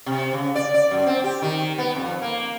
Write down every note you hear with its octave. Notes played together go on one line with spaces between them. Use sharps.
C3
C#3
D5
D5
F#2
C4
G4
D#3
B3
F2
A#3